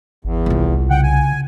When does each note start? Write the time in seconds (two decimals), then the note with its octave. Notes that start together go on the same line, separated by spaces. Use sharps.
0.25 G#1 E2
0.46 C2 F4
0.90 C#3 F#5 G5
1.03 G#5